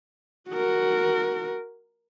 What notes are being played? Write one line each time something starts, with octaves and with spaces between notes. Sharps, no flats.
F#4 A#4